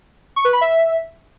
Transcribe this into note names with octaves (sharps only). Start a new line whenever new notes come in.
C#6
B4
B5
E5